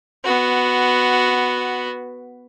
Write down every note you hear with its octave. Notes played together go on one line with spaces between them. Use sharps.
B3 F#4